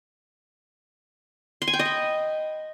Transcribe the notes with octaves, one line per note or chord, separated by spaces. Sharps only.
C6
G#5
G5
D#5
B5